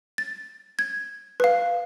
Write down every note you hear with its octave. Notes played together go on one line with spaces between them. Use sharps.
A6
G#6
B4 F5